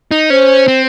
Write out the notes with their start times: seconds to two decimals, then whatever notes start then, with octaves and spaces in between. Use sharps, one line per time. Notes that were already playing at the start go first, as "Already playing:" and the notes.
0.11 D#4
0.30 C#4 C5
0.68 C4